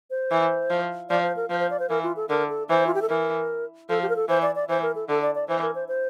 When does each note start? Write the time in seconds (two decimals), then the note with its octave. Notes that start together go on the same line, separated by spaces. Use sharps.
0.10 C5
0.31 E3
0.70 F3
1.09 F3 D5
1.23 C5
1.36 A#4
1.50 F3 C5
1.60 C5
1.70 D5
1.79 C5
1.89 E3 A#4
2.03 F4
2.16 A4
2.29 D3 A#4
2.49 A4
2.69 E3 C5
2.87 F4
2.94 G4
3.02 A4
3.09 E3 A#4
3.89 F3 A4
4.02 G4
4.09 A#4
4.16 A4
4.29 E3 C5
4.42 D5
4.55 D5
4.69 E3 C5
4.82 A#4
4.95 A4
5.09 D3 A4
5.22 D5
5.35 D5
5.48 E3 C5
5.62 A#4
5.75 C5
5.88 C5